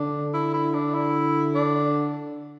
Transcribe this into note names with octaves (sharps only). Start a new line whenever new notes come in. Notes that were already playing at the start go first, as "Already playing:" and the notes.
Already playing: D3 D4
E4
E4
D4
E4
D4